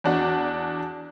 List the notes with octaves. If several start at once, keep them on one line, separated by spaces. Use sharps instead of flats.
E2 D4 F#4